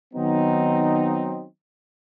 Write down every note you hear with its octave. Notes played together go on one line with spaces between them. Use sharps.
D#3 F#3 B3 C4 D#4